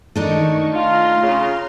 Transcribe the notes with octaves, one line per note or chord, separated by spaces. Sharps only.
D#3 A3 D4 D#4 C#6
F4 A#5 C6 F6
C#3 F4